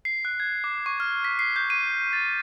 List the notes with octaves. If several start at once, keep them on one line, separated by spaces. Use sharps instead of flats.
C7
F#6
G#6
D6
C#6
F6
B6
C7
G6
D#7
A6